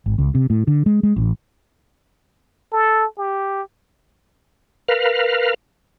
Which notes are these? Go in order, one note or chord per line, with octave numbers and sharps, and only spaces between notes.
G#1
C#2
C3
A2
D3
G#3
G#3
A1
A4
G4
A#4 B4 F5